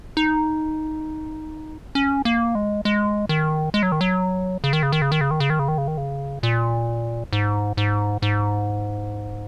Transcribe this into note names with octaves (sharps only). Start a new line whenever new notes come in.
D#4
C#4
A#3
G#3
G#3
D#3
G#3
F#3
D#3
F#3
C#3
D#3
C#3
D#3
C#3
D#3
C#3
D#3
C#3
D#3
C#3
D#3
C#3
D#3
C#3
A#2
G#2
G#2
G#2